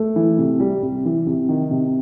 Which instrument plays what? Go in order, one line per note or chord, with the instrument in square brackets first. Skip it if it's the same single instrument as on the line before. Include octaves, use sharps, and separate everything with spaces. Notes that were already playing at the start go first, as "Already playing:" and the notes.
Already playing: [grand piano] A3 A4
E3
C3
G3
C3
E3
C3
D#3
C3